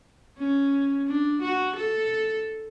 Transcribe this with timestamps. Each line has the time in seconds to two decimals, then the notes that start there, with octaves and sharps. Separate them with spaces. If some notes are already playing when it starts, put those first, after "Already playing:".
0.38 C#4
1.07 D4
1.42 F#4
1.76 A4